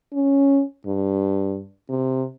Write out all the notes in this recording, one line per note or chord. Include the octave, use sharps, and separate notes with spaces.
C#4
G2
C3